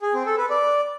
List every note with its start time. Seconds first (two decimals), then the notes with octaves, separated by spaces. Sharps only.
0.02 G#4
0.14 C4
0.26 A4
0.38 B4
0.50 D5